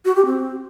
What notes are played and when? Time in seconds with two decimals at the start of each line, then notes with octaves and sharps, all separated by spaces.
0.05 F#4
0.16 G4
0.26 C4